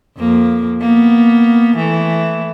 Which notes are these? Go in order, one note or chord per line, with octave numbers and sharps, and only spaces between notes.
F2 A#3
A#3 B3
E3 A3